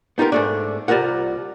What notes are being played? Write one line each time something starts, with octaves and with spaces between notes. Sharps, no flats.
B3 D#4 F4 G4 A#4
G#2 A3 D4
C2 G3 F4 A#4 F#5